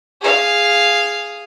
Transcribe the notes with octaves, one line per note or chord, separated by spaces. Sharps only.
G#4 F5